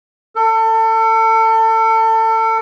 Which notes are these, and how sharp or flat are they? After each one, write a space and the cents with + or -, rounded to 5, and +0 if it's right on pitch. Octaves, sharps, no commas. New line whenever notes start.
A4 +30